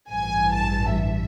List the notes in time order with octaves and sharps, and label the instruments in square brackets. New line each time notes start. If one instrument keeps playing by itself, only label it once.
[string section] A1 G2 E3 G#5
A5
E5